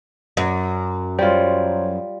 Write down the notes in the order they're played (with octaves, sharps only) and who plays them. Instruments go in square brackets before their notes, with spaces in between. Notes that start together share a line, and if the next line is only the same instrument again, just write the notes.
[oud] F#2
[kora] G3 F4 [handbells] C5 C#5